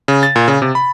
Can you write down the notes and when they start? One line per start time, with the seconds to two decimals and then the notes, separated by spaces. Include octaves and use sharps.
0.08 C#3
0.23 A6
0.36 A#2
0.48 C#3
0.62 C3
0.75 B5